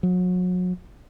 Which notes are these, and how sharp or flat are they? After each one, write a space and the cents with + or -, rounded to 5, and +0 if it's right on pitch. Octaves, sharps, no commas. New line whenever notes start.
F#3 -35